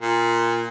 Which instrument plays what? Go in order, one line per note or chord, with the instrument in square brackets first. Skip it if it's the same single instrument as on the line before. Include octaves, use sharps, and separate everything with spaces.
[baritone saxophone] A#2